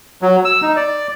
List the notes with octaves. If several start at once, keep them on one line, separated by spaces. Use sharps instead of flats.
F#3
E6
D#4
D5